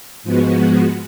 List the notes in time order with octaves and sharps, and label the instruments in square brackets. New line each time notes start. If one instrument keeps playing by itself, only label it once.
[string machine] G#2 F3 G#3 B3 F#4